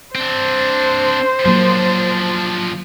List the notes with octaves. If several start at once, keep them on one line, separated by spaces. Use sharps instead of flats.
C4 D4 C5
F3 F#3 A#3 D4